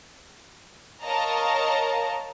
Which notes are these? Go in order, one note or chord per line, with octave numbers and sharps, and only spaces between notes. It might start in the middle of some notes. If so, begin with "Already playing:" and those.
A#4 C#5 D#5 F5 A5 A#5